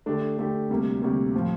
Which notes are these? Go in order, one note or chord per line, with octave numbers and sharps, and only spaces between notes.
D3 A3 D4 G4
D3 A3 D4 G4
D2 C3 G3 A#3
D2 C3 G3 A#3
A2 F3